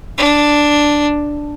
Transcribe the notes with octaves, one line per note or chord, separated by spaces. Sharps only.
D4